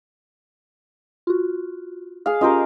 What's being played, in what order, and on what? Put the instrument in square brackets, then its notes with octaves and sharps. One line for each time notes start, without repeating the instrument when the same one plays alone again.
[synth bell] F4 F#4
[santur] G#4 F5
[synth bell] C#4 F4 G4 [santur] A#4 C5 D#5